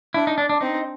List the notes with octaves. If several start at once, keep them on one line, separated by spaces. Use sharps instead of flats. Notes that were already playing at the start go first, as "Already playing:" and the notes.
D4 E4
D#4
D4
D4
C4 D#4